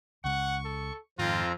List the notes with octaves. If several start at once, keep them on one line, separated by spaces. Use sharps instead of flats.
C#2 C#3 G#3 F#5 C#6
A4
F2 G#2 D#3 C4 F4 A#5